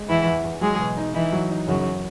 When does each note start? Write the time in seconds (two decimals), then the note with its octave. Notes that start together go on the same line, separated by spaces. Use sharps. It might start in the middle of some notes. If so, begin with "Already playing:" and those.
Already playing: G#3
0.09 E2 E3 E4
0.26 E2
0.44 E2
0.61 F#3 G#3 G#4
0.79 B2
0.97 D#4
1.14 E3 D#4 E4
1.33 F#3
1.50 D#4
1.68 F#2 C#3 F#3